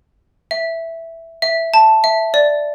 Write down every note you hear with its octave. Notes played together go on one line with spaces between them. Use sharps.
E5
E5
A5
E5
D5